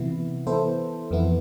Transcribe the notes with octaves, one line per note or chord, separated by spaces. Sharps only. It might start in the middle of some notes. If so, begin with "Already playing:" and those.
Already playing: C3 E3 B3 E4
E3 B3 E4 A4 C5
F2 E3 B3 E4